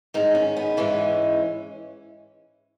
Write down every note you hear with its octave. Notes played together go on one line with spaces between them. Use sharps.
G#2 D#3 G#3 D#4
C#4
B3
G#2 E3 G#3 C#4